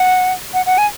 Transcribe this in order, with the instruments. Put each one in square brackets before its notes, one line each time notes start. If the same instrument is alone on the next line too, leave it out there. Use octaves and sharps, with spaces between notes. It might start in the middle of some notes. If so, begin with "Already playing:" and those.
Already playing: [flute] F#5
F#5
F#5
G#5